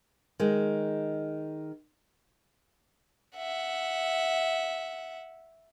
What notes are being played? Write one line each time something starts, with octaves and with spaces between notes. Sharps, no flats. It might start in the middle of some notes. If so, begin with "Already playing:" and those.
D#3 G#3
E5 F#5